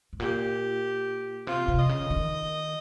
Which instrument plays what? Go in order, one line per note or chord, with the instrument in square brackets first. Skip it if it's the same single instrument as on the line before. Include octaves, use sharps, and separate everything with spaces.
[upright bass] G#2
[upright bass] A#2 [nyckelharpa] G4
[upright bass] C3 [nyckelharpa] F4
[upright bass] C3
[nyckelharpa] D#5
[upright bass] C#3
D#3